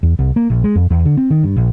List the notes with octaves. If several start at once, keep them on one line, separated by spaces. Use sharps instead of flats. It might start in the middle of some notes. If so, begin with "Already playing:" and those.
E2
C2
A#3
A#1
G#3
F2
E2
D3
C4
D#3
G2
A#1